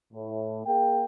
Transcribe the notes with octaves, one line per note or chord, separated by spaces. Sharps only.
A2
A#3 G#4 G5